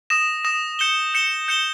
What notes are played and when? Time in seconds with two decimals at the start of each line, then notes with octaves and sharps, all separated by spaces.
0.10 D#6 A#6 E7
0.44 D#6 A#6 E7
0.79 G6 C#7 E7 G7
1.14 G6 C#7 E7 G7
1.48 G6 C#7 E7 G7